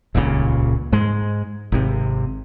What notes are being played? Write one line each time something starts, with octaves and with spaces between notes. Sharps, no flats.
D#1 C#2 A#2 C#3
G#2 G#3
G#1 C3